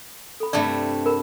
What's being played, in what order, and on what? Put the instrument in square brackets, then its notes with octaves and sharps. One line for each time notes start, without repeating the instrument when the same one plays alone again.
[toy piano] A4 B5
[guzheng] G2 C3 A3 [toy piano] D5 E5 B5
[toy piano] A#4 B5